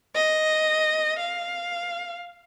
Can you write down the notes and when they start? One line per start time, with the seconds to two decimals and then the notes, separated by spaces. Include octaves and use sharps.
0.15 D#5
1.19 F5